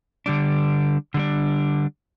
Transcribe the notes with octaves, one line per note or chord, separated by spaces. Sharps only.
D3 G3 D4
D3 G3 D4